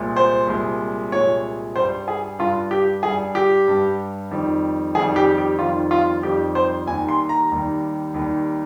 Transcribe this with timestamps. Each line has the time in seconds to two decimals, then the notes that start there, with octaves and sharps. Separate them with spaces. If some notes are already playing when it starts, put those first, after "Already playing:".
Already playing: C2 A#2 G#3
0.16 C5
0.47 C2 A#2 G#3
1.12 C2 A#2 G#3 C#5
1.76 G2 G3 C5
2.08 G#4
2.39 G2 G3 F4
2.71 G4
3.03 G2 G3 G#4
3.35 G4
3.68 G2 G3
4.31 F2 D#3 G3
4.95 F2 D#3 G3 G#4
5.16 G4
5.38 G4
5.59 F2 D#3 G3 F4
5.91 F4
6.22 F2 D#3 G3 G4
6.55 C5
6.86 D#2 D#3 G3 G#5
7.09 C6
7.29 A#5
7.51 D#2 D#3 G3
8.14 D#2 D#3 G3